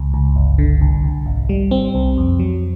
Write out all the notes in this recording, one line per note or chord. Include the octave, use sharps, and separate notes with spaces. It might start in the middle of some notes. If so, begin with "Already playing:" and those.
Already playing: C#2
C#2
G1
D3
C2
C2
G#1
G3
C4
C2
F2
F#3